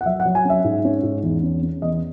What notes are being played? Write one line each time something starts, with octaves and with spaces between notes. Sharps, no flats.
F#5
F#3 E5
F#5
F#3
G#5
C#4 E5
G#2
C#4
G#2
E2
C#4
C#4
E2 D#5